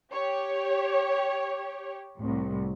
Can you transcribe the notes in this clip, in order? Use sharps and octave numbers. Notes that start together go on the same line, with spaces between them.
G4 C#5
C2 A2